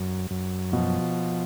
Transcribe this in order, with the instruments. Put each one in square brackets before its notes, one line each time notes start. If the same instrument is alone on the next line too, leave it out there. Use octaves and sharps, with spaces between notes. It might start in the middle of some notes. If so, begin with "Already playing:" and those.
Already playing: [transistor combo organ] F#2
F#2
[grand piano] B2 [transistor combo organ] F3